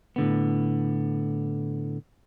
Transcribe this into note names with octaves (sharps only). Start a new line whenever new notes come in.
A2 D3 B3